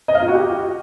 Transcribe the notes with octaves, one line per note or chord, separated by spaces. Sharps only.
D#5
F5
F4
F#4
G4